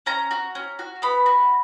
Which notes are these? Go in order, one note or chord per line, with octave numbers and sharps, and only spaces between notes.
C#4 A#5
F#4
C#4
F#4
B3 B5
F#4